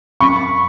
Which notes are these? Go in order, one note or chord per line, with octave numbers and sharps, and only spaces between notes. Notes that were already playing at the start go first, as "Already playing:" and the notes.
F#2 B5 C#6